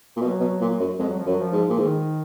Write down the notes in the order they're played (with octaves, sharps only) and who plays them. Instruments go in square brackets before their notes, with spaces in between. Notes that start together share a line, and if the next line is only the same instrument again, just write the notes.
[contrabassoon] A#2
[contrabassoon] B2 [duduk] F#3
[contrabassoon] B2
A#2
F#2
[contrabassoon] F2 [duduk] G#3
[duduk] F#3
F3
[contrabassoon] F#2 [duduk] F#3
[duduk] F3
[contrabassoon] G#2
A#2
[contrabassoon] G#2 [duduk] D#3